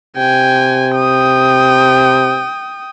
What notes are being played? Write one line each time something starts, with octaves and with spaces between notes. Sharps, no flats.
C3 G5 G#5
G5 D#6